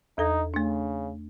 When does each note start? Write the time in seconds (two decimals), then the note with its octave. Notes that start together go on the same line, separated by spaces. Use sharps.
0.18 E2 D#4 A4 A#6
0.54 C#3 A3 D4